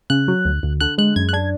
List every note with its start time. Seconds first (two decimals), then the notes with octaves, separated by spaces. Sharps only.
0.10 C#3 F#6
0.28 F#3
0.45 D2
0.63 D2
0.81 D3 F#6
0.98 G#3 F#6
1.16 F#2 G#6
1.29 F#6
1.33 D4 G#6